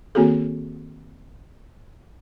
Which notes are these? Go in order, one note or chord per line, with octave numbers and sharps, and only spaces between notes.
D#3 A#3 C4 F#4 G#4 A4